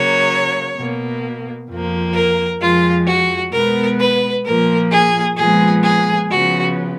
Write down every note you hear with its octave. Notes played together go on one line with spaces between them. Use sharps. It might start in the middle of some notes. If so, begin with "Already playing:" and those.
Already playing: C#3 F#3 A#3 C#5
B2 A#3
F2 F3 A#3
A#4
F2 F3 G#3 F4
F#4
B2 G#3 B3 A#4
B4
A#2 F3 A#3 A#4
G#4
A#2 F3 G#3 B3 G#4
G#4
C#3 F3 B3 F#4